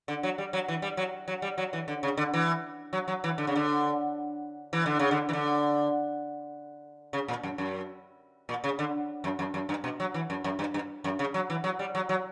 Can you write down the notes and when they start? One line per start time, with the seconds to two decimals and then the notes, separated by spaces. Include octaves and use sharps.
0.08 D3
0.23 F#3
0.38 G3
0.53 F#3
0.68 E3
0.82 G3
0.97 F#3
1.28 F#3
1.42 G3
1.58 F#3
1.73 E3
1.88 D3
2.03 C#3
2.17 D3
2.34 E3
2.93 F#3
3.08 F#3
3.24 E3
3.38 D3
3.47 C#3
3.56 D3
4.73 E3
4.86 D3
4.99 C#3
5.11 D3
5.29 E3
5.33 D3
7.13 C#3
7.28 A#2
7.43 F#2
7.58 F#2
8.49 A#2
8.64 C#3
8.79 D3
9.24 F#2
9.39 F#2
9.54 F#2
9.69 G2
9.84 B2
10.00 F#3
10.14 E3
10.30 F#2
10.44 F#2
10.59 G2
10.74 G2
11.04 F#2
11.19 C#3
11.34 F#3
11.50 E3
11.64 F#3
11.79 G3
11.95 F#3
12.09 F#3